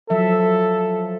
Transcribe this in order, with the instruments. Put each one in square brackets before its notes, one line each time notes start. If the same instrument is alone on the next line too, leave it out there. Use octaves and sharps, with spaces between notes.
[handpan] F3 F#3 E5 [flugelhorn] A4